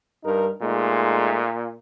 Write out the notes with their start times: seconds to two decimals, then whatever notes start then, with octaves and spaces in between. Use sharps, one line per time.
0.23 G2 D#4 A#4
0.61 A#2 G#3 A3 D#4